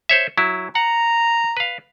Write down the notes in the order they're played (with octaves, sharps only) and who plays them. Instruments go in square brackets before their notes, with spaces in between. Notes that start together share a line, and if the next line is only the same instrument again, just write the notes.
[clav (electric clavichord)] C5 C#5 E5
F#3 E4
[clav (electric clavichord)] F#5 [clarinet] A#5
[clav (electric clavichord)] B4 F5